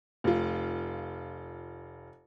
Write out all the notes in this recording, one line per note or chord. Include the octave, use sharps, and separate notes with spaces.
F1 F4